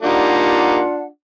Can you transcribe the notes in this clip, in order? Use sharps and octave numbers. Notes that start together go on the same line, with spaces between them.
G3 A#3 D4 D#4 F4 F#5